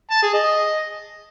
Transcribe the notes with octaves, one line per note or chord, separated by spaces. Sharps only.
A5
G#4
D#5